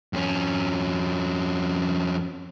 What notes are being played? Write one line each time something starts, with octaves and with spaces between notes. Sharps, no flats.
F2 C#4